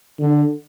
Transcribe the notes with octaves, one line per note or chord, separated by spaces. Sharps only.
D3